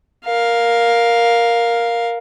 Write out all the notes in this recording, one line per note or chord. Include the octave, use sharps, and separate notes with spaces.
A#4 F5